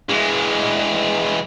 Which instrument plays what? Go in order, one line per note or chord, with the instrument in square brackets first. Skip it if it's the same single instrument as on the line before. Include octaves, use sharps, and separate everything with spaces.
[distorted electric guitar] E3 G#3